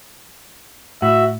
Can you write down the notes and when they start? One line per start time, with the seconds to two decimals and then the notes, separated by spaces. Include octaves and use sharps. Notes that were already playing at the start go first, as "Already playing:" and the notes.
1.02 A2 F#4 E5